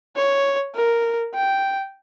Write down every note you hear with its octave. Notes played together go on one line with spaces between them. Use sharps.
C#5
A#4
G5